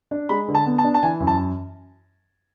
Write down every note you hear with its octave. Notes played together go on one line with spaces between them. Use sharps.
D4
G#3 B5
D3
A5
B3
A5
D4
A5
E3 G#5
F#2
A5